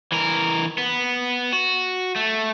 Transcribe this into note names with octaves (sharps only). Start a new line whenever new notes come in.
E3 A#4
B3
F#4
A3